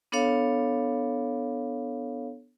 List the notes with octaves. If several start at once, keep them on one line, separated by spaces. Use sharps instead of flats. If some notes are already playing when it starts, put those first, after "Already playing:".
B3 D4 A4 C#5 F5